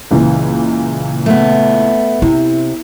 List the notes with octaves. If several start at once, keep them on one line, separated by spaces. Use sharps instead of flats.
C#2 A#2 E3
A3 B3
C3 E4